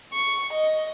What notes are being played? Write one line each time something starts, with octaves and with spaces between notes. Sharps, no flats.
C#6
D#5